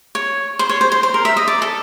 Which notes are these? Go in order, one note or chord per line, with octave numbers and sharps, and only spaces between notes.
C#5
C5
C#5
C5
C5
C5
A#4
E5
D#5
D5
A4